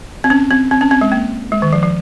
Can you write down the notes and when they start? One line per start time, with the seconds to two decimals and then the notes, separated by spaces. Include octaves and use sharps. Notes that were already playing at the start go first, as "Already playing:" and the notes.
0.24 C4
0.30 C#4
0.51 C4
0.71 C4
0.81 C#4
0.91 C4
1.01 G#3
1.12 A#3
1.52 G#3
1.62 D#3
1.73 F3
1.83 F3